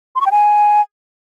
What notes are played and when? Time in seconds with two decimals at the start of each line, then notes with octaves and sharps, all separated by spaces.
0.16 C6
0.21 C#6
0.26 G5
0.31 G#5